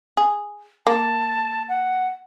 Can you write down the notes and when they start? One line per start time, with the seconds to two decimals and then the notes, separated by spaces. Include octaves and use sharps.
0.17 G#4
0.87 A#3 A5
1.69 F#5